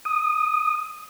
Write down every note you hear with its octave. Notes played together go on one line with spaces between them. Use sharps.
D#6